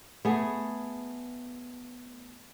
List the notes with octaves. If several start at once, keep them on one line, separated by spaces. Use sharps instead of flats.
A3 B3 G#4